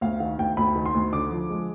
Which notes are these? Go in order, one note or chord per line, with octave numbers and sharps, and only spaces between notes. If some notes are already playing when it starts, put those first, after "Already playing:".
D2 F5
D#3 F5
D2 G5
D2 B5
D#3
C6
D2
D3 D6
F3
G#3